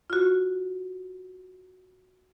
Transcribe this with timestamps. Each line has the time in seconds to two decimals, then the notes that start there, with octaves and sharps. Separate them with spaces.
0.10 F4 F#4